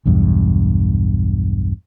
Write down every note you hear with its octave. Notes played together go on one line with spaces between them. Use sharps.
B1 E2 G2